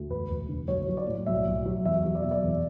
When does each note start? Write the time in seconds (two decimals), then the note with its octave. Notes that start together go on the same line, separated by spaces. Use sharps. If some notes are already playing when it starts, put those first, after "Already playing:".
Already playing: D2
0.09 E1 B4
0.29 E1
0.49 D3
0.68 B1 C#5
0.88 F#3
0.97 D5
1.07 A2
1.26 B1 E5
1.46 B1
1.66 F#3
1.85 E2 E5
2.05 F#3
2.15 D5
2.23 B2 E5
2.31 D5
2.44 E2